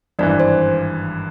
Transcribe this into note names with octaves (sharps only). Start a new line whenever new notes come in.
G#1 G2 E3 D5
C5